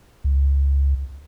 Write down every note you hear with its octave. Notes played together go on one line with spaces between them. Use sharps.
C#2